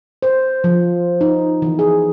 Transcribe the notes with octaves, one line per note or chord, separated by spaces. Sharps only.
C5
F3
D#4
E3
G#4